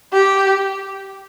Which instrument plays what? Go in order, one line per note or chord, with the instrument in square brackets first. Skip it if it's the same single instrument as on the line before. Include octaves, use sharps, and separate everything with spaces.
[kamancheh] G4